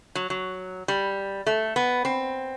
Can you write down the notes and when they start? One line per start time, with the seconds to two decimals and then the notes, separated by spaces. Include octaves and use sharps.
0.15 F#3
0.30 F#3
0.88 G3
1.47 A3
1.76 B3
2.05 C4